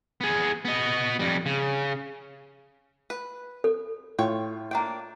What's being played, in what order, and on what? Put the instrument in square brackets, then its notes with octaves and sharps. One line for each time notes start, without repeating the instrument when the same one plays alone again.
[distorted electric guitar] B3 G#4
B3 D#5
F2 G3
C#3
[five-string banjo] B4
[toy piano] A4
[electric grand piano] A2 F4 [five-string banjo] C#5 G5
[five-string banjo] A#3 D4 G5